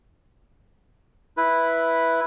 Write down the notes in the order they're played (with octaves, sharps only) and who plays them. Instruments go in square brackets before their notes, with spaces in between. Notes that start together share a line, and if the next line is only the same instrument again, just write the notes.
[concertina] E4 B4